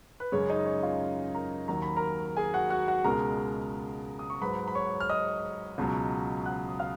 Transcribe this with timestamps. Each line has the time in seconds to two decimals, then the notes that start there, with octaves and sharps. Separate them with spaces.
0.20 B4
0.32 F#2 C#3 G#3 C#5
0.50 D#4 D#5
0.66 C#5
0.83 F4 F5
1.34 A#4 A#5
1.68 D#2 D#3 F#3 A#5
1.82 B5
1.96 A#4 A#5
2.37 G#4 G#5
2.54 F#4 F#5
2.70 F#4 F#5
2.88 F#4 F#5
3.04 C#2 B2 G#3 A#4 A#5
4.19 D#6
4.30 C#6
4.41 G#2 F#3 B4 B5
4.68 B5
4.75 C#5 C#6
5.00 F6
5.09 D#5 D#6
5.78 C#2 B2 F#3
6.46 F#5 F#6
6.69 D#6
6.79 F5 F6